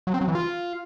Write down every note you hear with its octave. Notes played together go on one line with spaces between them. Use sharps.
F#3
C4
F#3
E3
F4